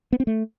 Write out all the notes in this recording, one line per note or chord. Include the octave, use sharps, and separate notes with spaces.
B3
C4
A3